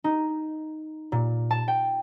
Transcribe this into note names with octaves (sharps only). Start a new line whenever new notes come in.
D#4
A#2
A5
G5